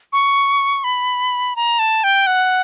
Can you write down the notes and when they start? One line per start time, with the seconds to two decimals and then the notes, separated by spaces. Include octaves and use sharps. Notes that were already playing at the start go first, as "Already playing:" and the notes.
0.13 C#6
0.84 B5
1.56 A#5
1.79 A5
2.04 G5
2.27 F#5